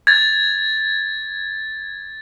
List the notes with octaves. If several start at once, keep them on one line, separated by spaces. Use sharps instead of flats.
G#6 A6